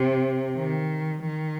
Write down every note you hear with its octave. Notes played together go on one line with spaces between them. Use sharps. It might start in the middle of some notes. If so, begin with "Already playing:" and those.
Already playing: C3
D#3
D#3